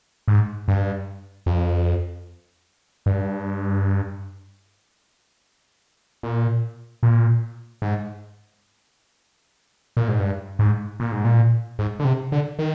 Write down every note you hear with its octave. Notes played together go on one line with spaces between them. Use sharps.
G#2
G2
F2
G2
A#2
A#2
G#2
A#2
G#2
G2
G#2
A#2
G#2
A#2
G#2
D3
C3
D3
D#3